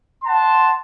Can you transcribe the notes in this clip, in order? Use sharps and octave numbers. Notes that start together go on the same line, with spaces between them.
F#5 A5 C6